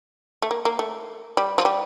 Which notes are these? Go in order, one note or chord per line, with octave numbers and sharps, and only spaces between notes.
A3
A#3
A#3
A3
G3
F3
G3